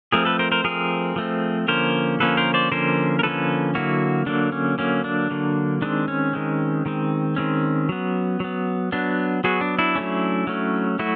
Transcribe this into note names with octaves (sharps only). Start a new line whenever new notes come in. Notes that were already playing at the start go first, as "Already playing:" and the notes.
F3 A3 C4 G#4 A#4
A4 B4
A#4 C5
A#4 C5
F3 A3 C4 G#4 A#4
F3 A3 C4
D3 F3 A#3 C#4 A#4 C5
D3 F3 A#3 C#4 A4 B4
A#4 C5
C5 D5
D3 F3 A#3 C#4 A#4 C5
A#4
D3 F3 A#3 C#4 A4 B4
D3 F#3 A#3 E4 F#4
D3 F#3 A#3 D4
C#4
D3 F#3 A#3 C#4
D4
D3 F#3 A#3
D#3 G#3 C4 D4
C#4
D#3 G#3 C4
D#3 G#3 C4
D#3 G#3 C4 C#4
F#3 B3
F#3 B3
F#3 B3 D4
F#3 B3 F#4 G#4
D4
D4 E4
F#3 A3 C#4
F#3 A3 C#4
F#3 A3 E4 F#4